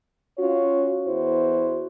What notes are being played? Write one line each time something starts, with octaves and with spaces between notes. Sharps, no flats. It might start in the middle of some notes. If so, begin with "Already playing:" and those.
C#4 F4 F#4 C#5
E2 E4 F#4 C5